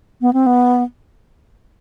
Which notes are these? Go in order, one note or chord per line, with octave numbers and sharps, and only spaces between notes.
B3
C4
B3